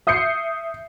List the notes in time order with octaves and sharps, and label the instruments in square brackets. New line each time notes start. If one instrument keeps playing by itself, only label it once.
[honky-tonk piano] E5 D#6 G6 C7 C#7